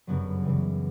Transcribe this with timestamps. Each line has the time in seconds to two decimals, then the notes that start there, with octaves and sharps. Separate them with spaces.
0.07 G1 F#2 C#3 F#3 B3
0.45 F#2 C#3 E3 G3